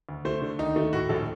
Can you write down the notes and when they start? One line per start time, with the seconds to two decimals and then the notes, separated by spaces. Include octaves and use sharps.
0.09 D2
0.25 A3 C5
0.42 D3
0.59 D#2 D#4
0.76 A3
0.93 A2 F#4
1.09 A#1 A4